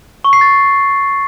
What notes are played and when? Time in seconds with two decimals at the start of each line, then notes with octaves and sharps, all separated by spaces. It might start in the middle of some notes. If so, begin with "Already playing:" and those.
0.25 C#6
0.33 C7
0.41 A6